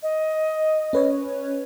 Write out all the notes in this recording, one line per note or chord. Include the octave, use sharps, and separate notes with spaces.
D#5
C#4 B4 C#5